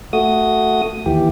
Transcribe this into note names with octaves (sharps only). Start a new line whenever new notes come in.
A3 F#4 D#6
D#2 E3 G4